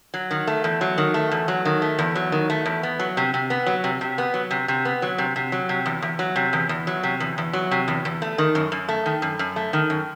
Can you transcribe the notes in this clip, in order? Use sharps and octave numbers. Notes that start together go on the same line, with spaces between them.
F#3
D#3
A3
E2
F#3
D#3
A3
E2
F#3
D#3
A3
E2
F#3
D#3
A3
E2
B3
F#3
C3
C3
B3
F#3
C3
C3
B3
F#3
C3
C3
B3
F#3
C3
C3
F#3
C3
E2
E2
F#3
C3
E2
E2
F#3
C3
E2
E2
F#3
C3
E2
E2
A3
D#3
F#2
F#2
A3
D#3
F#2
F#2
A3
D#3
F#2